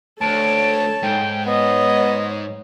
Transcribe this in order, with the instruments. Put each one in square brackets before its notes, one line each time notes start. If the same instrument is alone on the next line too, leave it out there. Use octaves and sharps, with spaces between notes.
[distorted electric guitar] D2 [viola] A4 C#5 [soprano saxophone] A5 [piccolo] D7
[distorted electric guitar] G#2 [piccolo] G5
[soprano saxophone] B3 [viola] C#5 [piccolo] D#5